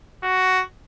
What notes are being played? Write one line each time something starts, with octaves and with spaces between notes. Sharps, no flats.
F#4